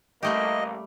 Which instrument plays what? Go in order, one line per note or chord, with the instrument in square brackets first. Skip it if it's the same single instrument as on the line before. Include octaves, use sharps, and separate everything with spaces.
[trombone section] A1 A#3 [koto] G3 A3 G4 [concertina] D#5